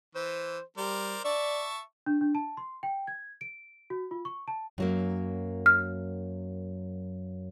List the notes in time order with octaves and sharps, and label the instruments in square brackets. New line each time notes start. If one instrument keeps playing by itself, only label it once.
[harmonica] E3 [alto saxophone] C5
[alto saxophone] G3 [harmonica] A#4 C5 D5
[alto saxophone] D5 [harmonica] E5 A5 C#6
[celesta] D4
D4
A5
C6
G5
G#6
D7
F#4
F4
C#6
A5
[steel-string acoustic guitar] F#2 F#3 A#3
[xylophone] F6